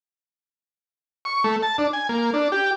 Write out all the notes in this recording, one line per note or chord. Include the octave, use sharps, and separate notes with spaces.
C#6
A3
A5
D4
G#5
A#3
D4
G4